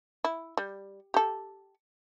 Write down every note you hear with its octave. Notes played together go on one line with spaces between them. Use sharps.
E4
G3
G4 A4